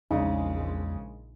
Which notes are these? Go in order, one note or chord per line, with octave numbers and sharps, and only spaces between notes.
A#1 E2 C#3 G#3 D4 D#4